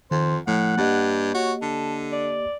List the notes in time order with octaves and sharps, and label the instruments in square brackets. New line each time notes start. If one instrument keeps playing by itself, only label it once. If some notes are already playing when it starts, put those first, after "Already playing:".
[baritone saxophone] F2 [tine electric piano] D#3 [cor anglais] C5
[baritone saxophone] A2 [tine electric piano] F3 A3 [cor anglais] F#5
[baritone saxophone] G2 [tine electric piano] A#3 G4 D#5
[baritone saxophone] F#4 [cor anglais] C#5
[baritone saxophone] D3 [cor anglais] A4
[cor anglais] D5